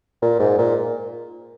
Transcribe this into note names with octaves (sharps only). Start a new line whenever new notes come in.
A#2
G#2
A#2